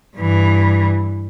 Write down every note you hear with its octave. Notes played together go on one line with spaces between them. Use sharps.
G2 E3